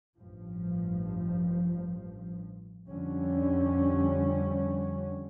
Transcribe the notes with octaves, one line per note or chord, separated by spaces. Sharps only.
A1 G2 F3
F2 D3 G3 C#4